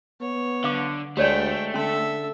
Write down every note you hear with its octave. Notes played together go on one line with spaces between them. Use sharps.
B3 C#5
D3 F5 D6
D2 G#3 A3 G4 C#5 D5 G5
D3 C#4 A4 E5 C6